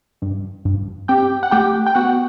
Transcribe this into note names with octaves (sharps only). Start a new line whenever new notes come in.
G2
G2
C4 G4 G5
F#5
A3 G4 G5
G5
B3 F#4 F#5